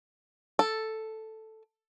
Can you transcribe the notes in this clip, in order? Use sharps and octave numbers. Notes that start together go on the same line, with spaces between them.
A4